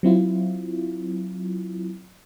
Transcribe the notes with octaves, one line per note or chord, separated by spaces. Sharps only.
F#3 C4 E4 F4